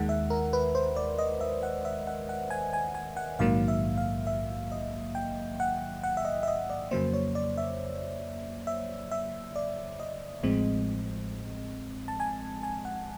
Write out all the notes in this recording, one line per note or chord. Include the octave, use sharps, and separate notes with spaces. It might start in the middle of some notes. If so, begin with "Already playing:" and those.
Already playing: D#2 D#3 G#3 F#5
E5
A#4
B4
C5
D5
D#5
E5
F#5
E5
F#5
F#5
G#5
G#5
G#5
F#5
A#1 G#2 D#3 F#3 A#3 F5
E5
F5
E5
D#5
G5
F#5
F#5
E5
D#5
E5
D#5
D5
F2 C#3 F#3 A#3 C5
C#5
D5
E5
E5
E5
D5
D#5
A1 A2 F3 G#3 C4
A5
G#5
G#5
F#5